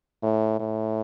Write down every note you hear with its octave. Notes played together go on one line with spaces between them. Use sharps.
A2
A2